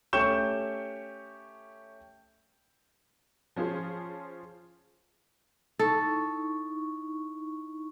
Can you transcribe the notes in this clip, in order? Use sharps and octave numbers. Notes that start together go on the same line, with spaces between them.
A3 C#4 G4 C#6 G6 E7
F3 C#4 F4 G#4 C5
D#4 E4 A4 C#6